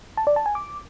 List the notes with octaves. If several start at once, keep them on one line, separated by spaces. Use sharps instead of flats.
A5
D5
A5
G#5
D6